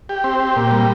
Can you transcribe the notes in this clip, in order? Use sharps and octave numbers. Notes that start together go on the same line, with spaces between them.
G4
C4
G4
A#2
G3